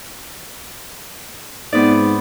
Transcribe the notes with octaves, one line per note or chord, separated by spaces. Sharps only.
G#2 B3 C4 D5